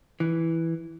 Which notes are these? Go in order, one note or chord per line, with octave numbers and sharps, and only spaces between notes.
E3